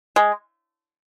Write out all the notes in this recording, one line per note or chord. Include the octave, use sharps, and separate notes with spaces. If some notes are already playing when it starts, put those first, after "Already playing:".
G#3